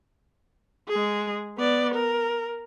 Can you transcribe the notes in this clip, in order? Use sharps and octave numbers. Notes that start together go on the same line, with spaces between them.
G#3 G#4
B3 D5
A#4